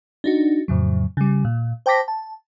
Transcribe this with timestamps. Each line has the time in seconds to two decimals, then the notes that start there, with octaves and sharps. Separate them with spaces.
0.24 D4 D#4 F#4
0.68 F2 A2 C#3 F#3
1.17 C#3 G3
1.45 A#2
1.86 C5 G5 A5 D6 A#6 B6
2.08 A5